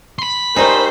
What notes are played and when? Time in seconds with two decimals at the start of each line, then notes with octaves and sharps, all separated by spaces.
0.19 B5 C6
0.56 G3 A3 D#4 A#4 C5 D5 G#5